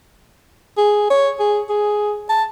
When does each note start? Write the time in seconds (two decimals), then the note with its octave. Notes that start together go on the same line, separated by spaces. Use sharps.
0.77 G#4
1.10 C#5
1.39 G#4
1.69 G#4
2.30 A5